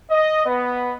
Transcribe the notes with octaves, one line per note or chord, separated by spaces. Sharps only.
D#5
B3